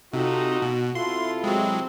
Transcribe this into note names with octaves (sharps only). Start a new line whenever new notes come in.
C3 D#4 F4 F#4 A4
B2
C3 E4 F4 A4 C6
F#3 G#3 C4